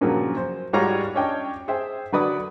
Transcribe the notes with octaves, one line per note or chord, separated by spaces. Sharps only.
G2 A#2 C#3 F3 F#3
C5
G#2 G3 F4 F#4 C#5 A#5
C#4 D4 C#5 D#5 G5 A5
G#4 C5 E5 G5
D3 F#3 B4 D5 D#6